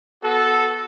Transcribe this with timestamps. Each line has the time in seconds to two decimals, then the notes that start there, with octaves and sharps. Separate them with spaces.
0.22 B3 F#4 A4